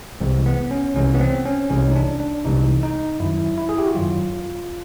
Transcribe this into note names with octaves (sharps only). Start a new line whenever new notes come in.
C2 C3 E3 G#3 C4
B3
C#4
C2 C3 E3 G#3 C#4
B3
C4
C#4
C2 C3 E3 G#3 C#4
D#4
D4
D4
C2 C3 E3 G#3 D#4
D#4
F#2 D#3 F#3 E4
E4
G#4
G4
F#4
F#2 D#3 F#3 F4